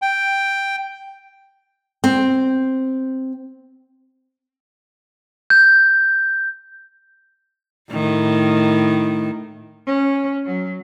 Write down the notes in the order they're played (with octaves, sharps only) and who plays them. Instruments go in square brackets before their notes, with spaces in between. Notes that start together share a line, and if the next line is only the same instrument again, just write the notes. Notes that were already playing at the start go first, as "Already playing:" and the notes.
[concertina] G5
[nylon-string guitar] C4
[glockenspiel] G6
[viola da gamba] A2 D#3
[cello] C#4
F#3